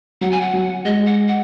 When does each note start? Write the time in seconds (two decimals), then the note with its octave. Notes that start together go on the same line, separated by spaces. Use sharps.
0.21 F#3 F#5
0.31 G#5
0.41 F#5
0.54 F#3
0.85 G#3 D#5
1.06 F#5
1.28 F#5